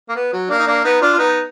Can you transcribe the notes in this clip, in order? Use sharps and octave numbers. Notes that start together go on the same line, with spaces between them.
A#3
B3
F#3
A#3 D4
D#4
A#3 D4
B3 D#4
D4 F4
F4
B3 D#4